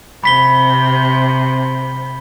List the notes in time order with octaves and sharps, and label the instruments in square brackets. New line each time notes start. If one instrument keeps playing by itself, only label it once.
[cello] C3 [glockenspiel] B5 B6 G7